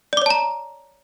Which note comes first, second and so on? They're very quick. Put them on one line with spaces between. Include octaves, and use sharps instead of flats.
D5 D6 C#5 A5 A#5